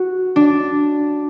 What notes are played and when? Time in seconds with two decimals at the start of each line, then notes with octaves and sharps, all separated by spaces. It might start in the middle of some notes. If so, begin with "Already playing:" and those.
Already playing: F#4
0.36 D4